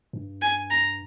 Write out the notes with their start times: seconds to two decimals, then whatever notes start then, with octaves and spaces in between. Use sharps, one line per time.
0.13 G2
0.42 G#5
0.70 A#5